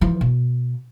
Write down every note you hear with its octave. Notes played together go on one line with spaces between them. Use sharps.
E3 F3
B2